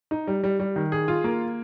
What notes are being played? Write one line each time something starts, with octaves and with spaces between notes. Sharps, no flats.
D#4
G3
G3
G3
D#3
G#4
F4
A#3